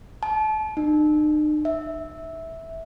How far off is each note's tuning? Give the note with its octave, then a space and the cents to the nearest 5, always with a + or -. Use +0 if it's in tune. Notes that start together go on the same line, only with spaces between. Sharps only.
A5 -30
D#4 -45
E5 -10